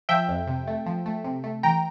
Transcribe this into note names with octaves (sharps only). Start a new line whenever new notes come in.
F3 E5 G5
F2
C3
A3
F3
A3
C3
A3
E3 G5 A#5